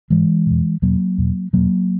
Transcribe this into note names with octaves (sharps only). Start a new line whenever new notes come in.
G#2 E3 G#3
E2 B2
E2 B2 F#3 A#3
E2 B2
E2 B2 F#3 A#3